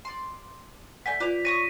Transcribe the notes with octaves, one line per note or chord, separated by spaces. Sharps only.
D5 C6
A3 D5 F#5 G#5 G6 B6
F4 B4 D5 D6 G6 F7
C#5 C#6 D#6 A#6 D#7